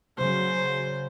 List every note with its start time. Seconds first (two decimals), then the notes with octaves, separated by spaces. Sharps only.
0.18 C#3 F#3 C5